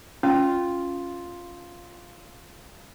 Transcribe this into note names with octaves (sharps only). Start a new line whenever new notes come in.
C#4 F4